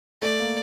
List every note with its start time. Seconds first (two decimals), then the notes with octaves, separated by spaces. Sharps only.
0.22 A3 D5
0.40 A#3